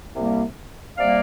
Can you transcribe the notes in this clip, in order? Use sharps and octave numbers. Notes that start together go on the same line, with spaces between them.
C2 C3 G3 A#3
C3 G3 A#3 D5 F5